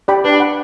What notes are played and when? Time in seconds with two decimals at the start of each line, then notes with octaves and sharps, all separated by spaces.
0.08 G4 D5 G5 B5
0.24 D4 B4
0.40 F#5 B5